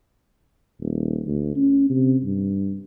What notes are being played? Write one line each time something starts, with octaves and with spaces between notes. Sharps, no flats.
D#1
D2
C#4
C3
G2